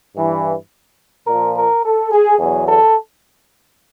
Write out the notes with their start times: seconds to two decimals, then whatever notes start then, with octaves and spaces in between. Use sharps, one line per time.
0.15 G2 E3
1.27 A#2 F3 A#4
1.55 A#4
1.83 A4
2.11 G#4
2.39 E2 B2 F#3 G#4
2.67 A4